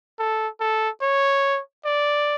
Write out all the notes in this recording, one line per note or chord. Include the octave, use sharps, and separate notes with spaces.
A4
A4
C#5
D5